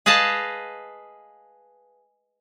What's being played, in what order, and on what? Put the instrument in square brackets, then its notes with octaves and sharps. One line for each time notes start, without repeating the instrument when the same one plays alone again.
[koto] G#4 B4 D#5 F5 A5